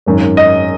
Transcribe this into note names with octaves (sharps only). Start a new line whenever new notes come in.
G#1 F#2 D#3
D#5